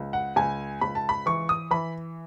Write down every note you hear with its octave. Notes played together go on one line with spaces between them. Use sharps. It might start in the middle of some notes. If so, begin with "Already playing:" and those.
Already playing: C#2
F#5
C#2 G#5
C#2 B5
A5
B5
E3 C#6
D#6
E3 B5